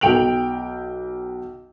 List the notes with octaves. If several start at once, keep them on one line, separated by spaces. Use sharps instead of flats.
B1 G5 D7 F7 F#7